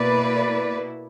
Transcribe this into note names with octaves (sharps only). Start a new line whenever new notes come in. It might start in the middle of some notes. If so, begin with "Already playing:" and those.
Already playing: B2 A#3 E4 B4 D5